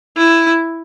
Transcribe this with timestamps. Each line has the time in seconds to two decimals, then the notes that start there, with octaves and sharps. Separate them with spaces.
0.17 E4